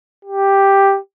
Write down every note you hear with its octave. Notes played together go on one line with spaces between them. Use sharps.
G4